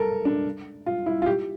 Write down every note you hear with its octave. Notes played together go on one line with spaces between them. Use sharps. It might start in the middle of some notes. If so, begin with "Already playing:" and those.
Already playing: A4 A#4
D4
F4
E4
F4
G4